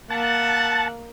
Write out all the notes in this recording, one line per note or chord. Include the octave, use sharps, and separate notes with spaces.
A#3 E5 F#5 A5